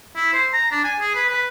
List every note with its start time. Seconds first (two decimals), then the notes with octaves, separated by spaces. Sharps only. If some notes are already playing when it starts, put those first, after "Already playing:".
0.16 E4
0.33 C5
0.53 A#5
0.72 D4
0.84 G#5
1.00 G#4
1.15 B4
1.29 B4